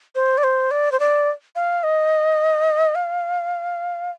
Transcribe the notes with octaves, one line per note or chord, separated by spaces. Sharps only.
C5
D5
C5
D5
C5
D5
F5
D#5
F5